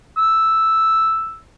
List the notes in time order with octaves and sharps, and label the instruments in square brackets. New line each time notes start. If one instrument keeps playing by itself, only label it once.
[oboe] E6